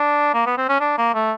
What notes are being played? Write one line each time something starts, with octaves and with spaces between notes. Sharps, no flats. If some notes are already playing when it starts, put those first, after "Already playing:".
Already playing: D4
A#3
B3
C4
C#4
D4
A#3
A3